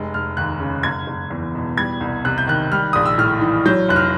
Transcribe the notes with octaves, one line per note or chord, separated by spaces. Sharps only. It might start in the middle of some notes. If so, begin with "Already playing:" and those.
Already playing: F1 G#3
F1 F6
D#2 F#6
C#3
F#1 G#6
F#1
E2
B2
G3 G#6
C2
C3 F#6
G6
D#3 F#6
G3 F6
A#1 D#6
E6
A2 F6
E3
F#3 G6
F1 F#6
F6